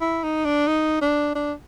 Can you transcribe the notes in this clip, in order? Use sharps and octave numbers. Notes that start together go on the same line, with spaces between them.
E4
D#4
D4
D#4
D4
D4